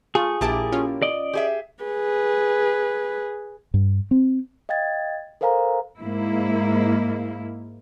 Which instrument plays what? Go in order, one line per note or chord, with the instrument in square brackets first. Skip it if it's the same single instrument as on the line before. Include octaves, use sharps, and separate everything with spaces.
[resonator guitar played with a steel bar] A3 [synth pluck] F4 [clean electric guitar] G#4
[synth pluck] A#1 A5 D6 [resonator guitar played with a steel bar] A#3 E4 G4
[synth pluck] C#4 F4
[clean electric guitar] D5 D#5
[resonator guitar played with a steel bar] G4 G#4 E5
[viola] G#4 B4
[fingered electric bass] G2
C4
[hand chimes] D#5 F5 G5 G#6 A6
A4 A#4 C5 F5 G#5 A#5
[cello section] G#2 G#3 A#3 E4